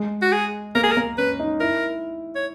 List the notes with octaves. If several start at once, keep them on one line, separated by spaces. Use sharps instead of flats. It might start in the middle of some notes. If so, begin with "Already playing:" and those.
Already playing: G#3
F#4
G#4
A#3 A#4
G#4
A#4
A#3
C#4 B4
D#4
E4 A#4
C#5